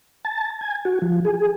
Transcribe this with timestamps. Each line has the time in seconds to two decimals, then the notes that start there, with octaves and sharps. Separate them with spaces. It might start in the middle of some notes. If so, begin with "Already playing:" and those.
0.25 A5
0.61 G#5
0.85 F#4
1.02 F3
1.25 G#4